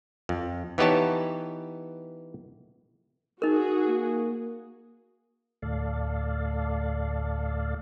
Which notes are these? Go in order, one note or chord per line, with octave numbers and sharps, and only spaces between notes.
F2
E3 B3 D#4 G4 C#5 A5
D#4 F#4 G#4 A#4
A#3
D2 A2 A4 D5 F5